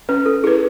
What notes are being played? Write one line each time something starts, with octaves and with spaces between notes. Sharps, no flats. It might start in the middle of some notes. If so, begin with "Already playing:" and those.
C#4 B4
A4
E4 G#4 B4